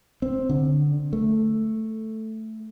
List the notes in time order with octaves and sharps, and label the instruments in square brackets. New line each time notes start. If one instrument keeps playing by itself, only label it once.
[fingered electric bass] C4
D3
A3